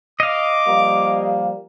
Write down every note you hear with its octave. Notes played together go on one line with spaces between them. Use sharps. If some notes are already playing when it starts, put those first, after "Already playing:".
D#5 F5 D6
F3 G3 A#3